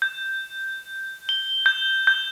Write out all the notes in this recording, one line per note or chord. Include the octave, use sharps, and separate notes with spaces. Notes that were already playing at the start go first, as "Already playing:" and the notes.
G6
G7
G6
G6